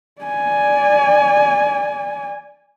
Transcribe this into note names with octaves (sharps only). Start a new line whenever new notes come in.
D5 G#5